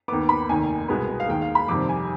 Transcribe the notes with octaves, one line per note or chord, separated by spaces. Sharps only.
D#2 D#3 B3 D6
B5
F1 D#2 D#3 G#5
C2 B2 G#3 B3
F5
D#2 D#3 G#3 G5
F5
B5
F2 C3 D#3 G3 D6
G#5